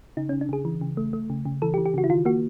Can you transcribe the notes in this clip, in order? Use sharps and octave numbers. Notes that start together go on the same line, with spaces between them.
C#3 D#4
C#4
C#3
D4
C#3 G#4
E3
C#3
A3
A3
C#3
C#3
E3 A4
G4
E3
G4
C#3 F#4
E4
D#3 F4
A#3 F#4